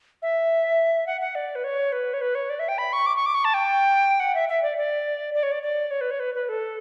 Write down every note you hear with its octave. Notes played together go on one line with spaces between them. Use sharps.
E5
F#5
F#5
D5
B4
C#5
B4
C#5
B4
C#5
D5
E5
G5
B5
C#6
D6
C#6
D6
C#6
A5
G5
F#5
E5
E5
D5
D5
D5
C#5
D5
D5
C#5
B4
C#5
B4
B4
A4